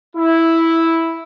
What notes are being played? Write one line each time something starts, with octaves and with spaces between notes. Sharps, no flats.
E4